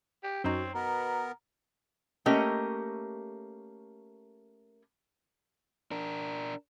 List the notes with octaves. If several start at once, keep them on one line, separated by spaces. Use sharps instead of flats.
G4
F#2 C4 D#4 F#4 C#5
B2 B3 A#4 A#5
A3 A#3 C#4 G4 A#4 D#5
D4 A#4